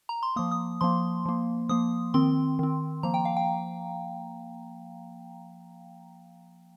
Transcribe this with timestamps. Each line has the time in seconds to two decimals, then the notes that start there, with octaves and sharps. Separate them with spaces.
0.09 A#5
0.23 C6
0.36 F3 A#3 D#6
0.52 D#6
0.81 F3 A#3 C6
1.26 F3 A#3
1.69 F3 A#3 D#6
2.14 D#3 C4 C6
2.59 D#3 C4
3.03 F3 A#3 A#5
3.14 G5
3.25 F5
3.37 G5